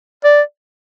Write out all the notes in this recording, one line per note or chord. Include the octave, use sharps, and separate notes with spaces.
D5